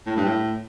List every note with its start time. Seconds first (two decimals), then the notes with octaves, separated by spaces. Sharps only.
0.06 A2
0.16 G2
0.26 A2